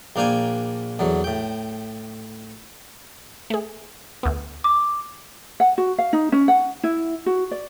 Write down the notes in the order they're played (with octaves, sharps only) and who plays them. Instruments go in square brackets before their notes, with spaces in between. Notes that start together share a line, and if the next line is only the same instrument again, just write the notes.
[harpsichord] A#1 A#3 D4 F5 G5 G#5
E2 D3 F#3
A2 G5
[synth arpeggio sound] A3 G#4
D2 B3
[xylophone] D6
[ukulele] F#5
F#4
F5
D#4
C#4
F#5
E4
F#4
D5